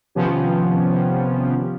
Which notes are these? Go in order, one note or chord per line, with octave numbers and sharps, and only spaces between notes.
C3 D#3 F3 B3 C#4 G4